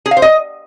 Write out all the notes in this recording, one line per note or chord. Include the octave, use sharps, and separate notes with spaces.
G#4
F5
C5
D#5